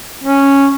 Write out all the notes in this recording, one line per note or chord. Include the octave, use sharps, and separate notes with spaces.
C#4